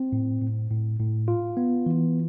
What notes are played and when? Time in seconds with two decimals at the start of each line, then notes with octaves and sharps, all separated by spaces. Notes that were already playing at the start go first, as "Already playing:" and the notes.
Already playing: C4
0.12 A2
0.41 A2
0.70 A2
1.00 A2
1.28 F4
1.57 B3
1.86 E3